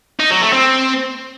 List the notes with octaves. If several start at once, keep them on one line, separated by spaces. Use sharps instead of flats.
D#4
F#3
A3
C4